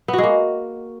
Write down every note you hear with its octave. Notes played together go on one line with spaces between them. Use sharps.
B3
F#4
G#3
A#3